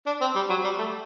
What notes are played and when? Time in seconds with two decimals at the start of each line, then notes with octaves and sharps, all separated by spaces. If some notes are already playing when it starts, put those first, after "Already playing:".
0.06 D4
0.21 C4
0.35 G3
0.49 F#3
0.64 G3
0.78 A3